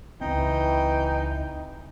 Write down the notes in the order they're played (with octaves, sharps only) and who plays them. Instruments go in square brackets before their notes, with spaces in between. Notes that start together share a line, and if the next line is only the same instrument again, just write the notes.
[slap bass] C#2 C4 [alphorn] E3 [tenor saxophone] D#4 [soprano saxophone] G5